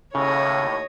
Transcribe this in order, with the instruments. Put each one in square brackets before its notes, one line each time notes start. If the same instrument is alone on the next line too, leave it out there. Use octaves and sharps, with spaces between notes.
[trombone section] D#2 A2 [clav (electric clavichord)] C#3 [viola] C#5 D#5